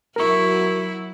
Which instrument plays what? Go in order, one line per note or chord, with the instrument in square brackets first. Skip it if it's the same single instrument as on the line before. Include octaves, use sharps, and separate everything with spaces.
[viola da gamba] F#3 E4 F#4 [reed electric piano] A#4 C#6